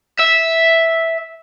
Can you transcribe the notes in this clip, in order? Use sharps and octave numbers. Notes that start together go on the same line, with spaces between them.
E5